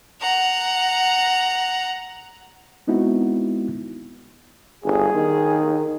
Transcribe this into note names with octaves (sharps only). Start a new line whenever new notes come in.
F#5 A#5
G#3 B3 C4 D#4 E4 F#4
G1 G#4
D#3